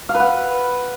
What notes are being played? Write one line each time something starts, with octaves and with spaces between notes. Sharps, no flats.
F5
B4
F#5